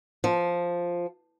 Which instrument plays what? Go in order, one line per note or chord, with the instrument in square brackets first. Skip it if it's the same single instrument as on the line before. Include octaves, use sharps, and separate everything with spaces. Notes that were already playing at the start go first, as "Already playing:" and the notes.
[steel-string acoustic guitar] F3